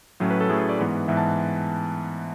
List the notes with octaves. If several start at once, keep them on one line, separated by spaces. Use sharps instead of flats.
A2 F#3 A3 C#4
B4
A4
A2 F#3 A3 C#4 G#4
A4
D5
G#2 E3 B3
G#2 E3 B3 E5
A5